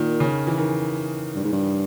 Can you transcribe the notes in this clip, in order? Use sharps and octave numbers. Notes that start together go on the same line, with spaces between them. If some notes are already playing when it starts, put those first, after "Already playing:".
Already playing: A#2 D#3
C#3
E3
D#3
G2
G#2
G2